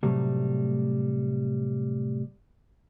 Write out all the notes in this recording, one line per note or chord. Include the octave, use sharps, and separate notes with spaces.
A2 C3 F#3 G3 A3